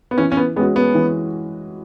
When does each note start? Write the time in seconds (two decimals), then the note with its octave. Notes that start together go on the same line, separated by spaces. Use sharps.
0.11 B3
0.18 E3 C#4
0.32 C#4
0.37 B3
0.56 G#3 B3 C#4 F#4
0.76 B3
0.95 E3